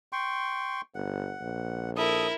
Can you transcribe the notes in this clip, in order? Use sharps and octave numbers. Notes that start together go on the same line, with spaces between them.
G5 C6 C#6
G1 F#5
A#1
E4 A4 A#4 D#6